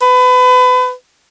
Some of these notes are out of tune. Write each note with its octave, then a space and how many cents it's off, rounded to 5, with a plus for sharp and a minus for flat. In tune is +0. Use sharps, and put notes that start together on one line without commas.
B4 +30